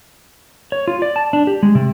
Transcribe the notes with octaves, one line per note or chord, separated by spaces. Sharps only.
C#5
F4
D5
A5
D4
G4
G#3
C3